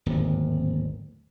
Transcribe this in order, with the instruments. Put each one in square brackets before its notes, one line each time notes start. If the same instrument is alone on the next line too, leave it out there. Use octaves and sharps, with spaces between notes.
[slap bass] D1 G#1 D#2